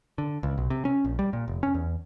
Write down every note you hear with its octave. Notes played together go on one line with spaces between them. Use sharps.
D3
C#2
B1
C3
C#4
A#1
G3
A#2
F1
C#4
E2